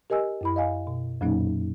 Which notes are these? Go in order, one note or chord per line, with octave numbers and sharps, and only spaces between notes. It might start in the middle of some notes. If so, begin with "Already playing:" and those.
G4 A#4 D#5 G#5 E6
F#2 E4 B5
D#5 F5 G#5
B2
F2 A#2 F#3 A#3 C#4 D#4